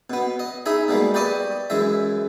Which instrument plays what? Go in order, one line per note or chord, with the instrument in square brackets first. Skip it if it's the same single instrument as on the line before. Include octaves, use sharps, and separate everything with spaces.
[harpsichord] B2 B3
D#5
D#4 G#4 E5 B5
B2 G3 G#3 A#3
G4 B4 D5 D#5 C#6 D#6
F#2 E3 G#3 E5